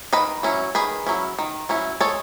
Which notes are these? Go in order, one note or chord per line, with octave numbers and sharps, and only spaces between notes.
D#3 B4 D#5
F#3 C#4 E4
D#3 G#4 B4
F#3 C#4 E4
D#3
F#3 C#4 E4
G#3 A4 C#5